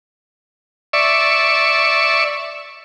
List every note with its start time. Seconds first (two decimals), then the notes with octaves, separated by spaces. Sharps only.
0.93 D5 E5 C#6